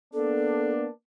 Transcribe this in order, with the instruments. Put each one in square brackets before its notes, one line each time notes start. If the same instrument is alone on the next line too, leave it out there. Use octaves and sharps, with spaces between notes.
[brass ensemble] A#3 B3 D4 [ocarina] A4